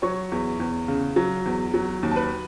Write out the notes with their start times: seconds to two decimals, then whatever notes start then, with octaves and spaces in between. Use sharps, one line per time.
0.02 F#3 C#5 C#6
0.32 E2
0.60 E2
0.88 C#3
1.16 F#3
1.46 E2
1.74 F#3
2.03 D#2
2.11 A5
2.16 B4 B5